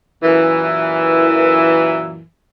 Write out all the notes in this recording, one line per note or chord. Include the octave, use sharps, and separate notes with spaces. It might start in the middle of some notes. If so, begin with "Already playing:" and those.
F#2 A#2 E3